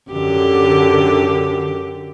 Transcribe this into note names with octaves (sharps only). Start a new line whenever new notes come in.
F#2 D3 G4